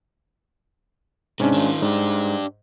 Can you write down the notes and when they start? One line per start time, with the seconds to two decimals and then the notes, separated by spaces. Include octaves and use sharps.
1.40 G#2 C3 C#4 D4
1.53 D#3 F4
1.82 G#2 D4 G4